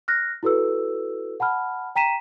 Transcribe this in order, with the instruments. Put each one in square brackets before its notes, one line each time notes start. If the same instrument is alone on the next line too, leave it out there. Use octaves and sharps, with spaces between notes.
[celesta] F6 F#6 A#6
E4 F#4 A4 B4 E6
F#5 A5 B5 F6
G5 A#5 B6 D#7 E7